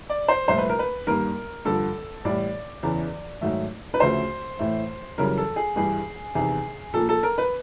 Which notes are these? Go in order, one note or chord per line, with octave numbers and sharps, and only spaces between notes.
D5
C5
C2 A#2 F3 A3 C5
B4
A#4
B4
G2 D#3 G3 A#3 A#4
G2 D3 F3 A4
A2 E3 G3 D5
E2 C#3 E3
G#2 D#3 F#3 A3
B4
D2 C#3 F3 A3 C5
A2 E3 A3
F#2 C#3 E3 G3 A#4
A4
G#4
G2 E3 G3 G#4
E2 C3 D#3 G#4
A#2 F3 A#3 A4
A4
A#4
B4